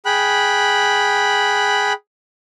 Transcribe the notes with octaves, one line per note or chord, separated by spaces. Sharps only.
G#4 G5 B5 F#6